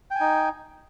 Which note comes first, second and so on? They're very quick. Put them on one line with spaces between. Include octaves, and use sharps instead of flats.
G5 G#5 D#4